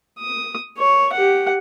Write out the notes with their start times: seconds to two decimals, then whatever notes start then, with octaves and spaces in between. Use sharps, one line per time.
0.19 D#6
0.78 C#5
1.12 G4 F#5